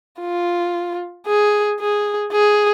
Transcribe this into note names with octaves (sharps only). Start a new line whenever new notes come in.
F4
G#4
G#4
G#4